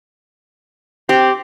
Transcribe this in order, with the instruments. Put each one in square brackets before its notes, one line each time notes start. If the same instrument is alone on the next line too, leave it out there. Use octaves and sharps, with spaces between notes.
[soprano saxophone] C4 [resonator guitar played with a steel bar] G4